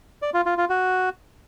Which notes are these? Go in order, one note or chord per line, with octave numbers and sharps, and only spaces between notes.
D5
F4
F4
F4
F#4